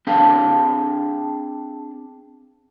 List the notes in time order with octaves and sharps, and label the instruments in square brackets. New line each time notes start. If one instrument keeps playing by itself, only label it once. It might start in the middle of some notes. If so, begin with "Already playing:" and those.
[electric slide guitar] C4 D4 G#4 F5 A5